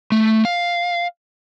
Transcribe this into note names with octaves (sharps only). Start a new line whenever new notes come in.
A3
F5